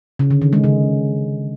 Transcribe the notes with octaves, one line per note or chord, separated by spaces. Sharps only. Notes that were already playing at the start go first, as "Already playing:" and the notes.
C#3
D3
D#3
G#3
C#3